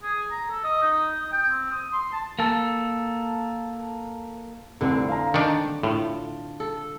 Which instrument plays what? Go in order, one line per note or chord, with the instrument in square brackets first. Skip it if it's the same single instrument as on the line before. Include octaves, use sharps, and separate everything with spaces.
[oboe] G#4
A#5
A4
D#5
D#4
D#4
G5
C4
D#6
C6
A5
[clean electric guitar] A#3 A4
[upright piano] F1 C2 A4 [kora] D3 C4
[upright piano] F5 A#5
[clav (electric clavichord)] D#3 D4 [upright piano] A5 C#7
[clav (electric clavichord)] A2 [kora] F4
[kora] A4